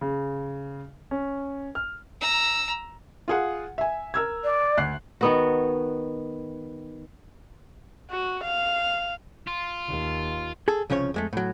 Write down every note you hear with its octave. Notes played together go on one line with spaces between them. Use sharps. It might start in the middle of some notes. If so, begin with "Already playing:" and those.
C#3
C#4
F6
A#5 E6
F4 G#4 F#5
E5 G#5
A#4 E6 G#6
D5
D2 F#6 C7
D#3 B3 F#4
F#4
F5
F4
D#2
G#4 A4
C2 C#3 F3 C#4 C#5
F2 G#3 A3
A2 F#3